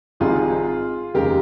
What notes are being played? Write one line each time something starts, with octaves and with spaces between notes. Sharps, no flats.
G#1 G#2 G3 C4 F4 G#4
F1 D#2 C#3 G#3 G4 A#4